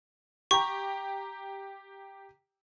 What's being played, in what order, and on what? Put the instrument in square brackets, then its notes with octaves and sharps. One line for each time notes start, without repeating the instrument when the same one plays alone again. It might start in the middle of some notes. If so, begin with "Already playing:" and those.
[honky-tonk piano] G4 G5 A#5 [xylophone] C#6